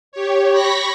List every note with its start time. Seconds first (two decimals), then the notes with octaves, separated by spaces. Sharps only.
0.12 G4 C#5
0.51 B5 C#6 A#6 B6